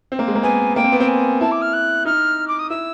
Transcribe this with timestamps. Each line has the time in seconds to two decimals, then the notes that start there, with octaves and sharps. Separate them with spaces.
0.12 C4
0.19 A#3
0.28 G#3
0.36 A#3
0.43 B3 G#5
0.76 A#3 G5
0.84 C4
0.92 B3
1.00 C4 G5
1.08 G#5
1.41 E4 A5
1.51 D6
1.62 F6
1.73 F#6
2.05 D#4 F6
2.48 D6
2.59 D#6
2.70 E4 E6